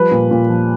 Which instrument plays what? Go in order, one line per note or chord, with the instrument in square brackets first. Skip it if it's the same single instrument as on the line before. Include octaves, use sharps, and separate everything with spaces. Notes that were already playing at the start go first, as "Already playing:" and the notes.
Already playing: [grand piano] F3 G3 B4
A#2
A#2
F3